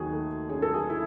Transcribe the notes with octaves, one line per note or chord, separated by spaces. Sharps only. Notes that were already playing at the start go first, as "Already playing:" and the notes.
Already playing: D#2 D#3 F#4 G#4
A3
C#4 G#4
A4
G#4
E4